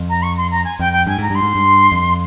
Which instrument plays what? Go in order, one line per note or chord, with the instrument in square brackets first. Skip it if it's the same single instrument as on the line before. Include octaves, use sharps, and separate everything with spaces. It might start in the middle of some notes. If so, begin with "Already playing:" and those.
Already playing: [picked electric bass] F2
[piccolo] A#5
C#6
C6
A#5
G#5
[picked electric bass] F2 [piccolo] G5
[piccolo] G5
[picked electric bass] G2 [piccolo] G#5
[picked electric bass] G#2 [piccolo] A#5
[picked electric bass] G2 [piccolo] C6
[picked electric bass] G#2
G2
F2